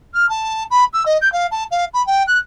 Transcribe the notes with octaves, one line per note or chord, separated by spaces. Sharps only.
F6
A5
B5
E6
D#5
G6
F5
A5
F5
B5
G5
F#6